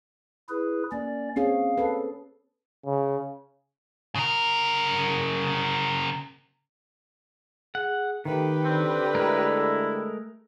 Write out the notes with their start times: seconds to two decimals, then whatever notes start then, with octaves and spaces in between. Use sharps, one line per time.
0.49 E4 G#4 B4
0.92 A#3 C#4 D5
1.36 C4 C#4 G#4 F5
1.78 A4 B4
2.86 C#3
4.15 C#3 A#4
7.75 G#4 F#5
8.25 D#3 A3 G4 B4
8.65 D3 C4
9.15 G#3 A3 E4 A#4